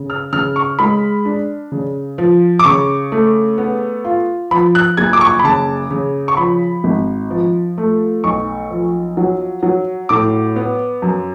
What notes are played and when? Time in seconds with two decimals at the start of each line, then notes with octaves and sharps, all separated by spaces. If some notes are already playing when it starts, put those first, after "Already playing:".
Already playing: C#3
0.10 F6
0.33 C#3 F6
0.56 C#6
0.79 G#3 B5
1.25 D4
1.72 C#3
2.18 F3
2.59 D6
2.65 C#3 C#6
3.12 A3
3.58 B3
4.05 F4
4.51 F3 B5
4.75 F#6
4.97 F#1 G#6
5.13 D6
5.21 C#6
5.39 B5
5.44 C#3 A5
5.91 C#3
6.28 C#6
6.37 F3 B5
6.84 G#1
7.30 F3
7.78 A3
8.24 B1 C#6
8.71 F3
9.17 F#3
9.63 F#3
10.09 A2 D6
10.56 B3
11.02 F#2